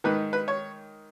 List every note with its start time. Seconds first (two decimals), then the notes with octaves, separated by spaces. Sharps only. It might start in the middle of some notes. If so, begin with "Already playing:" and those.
0.04 G#2 D#3 B4
0.33 B4
0.48 C#5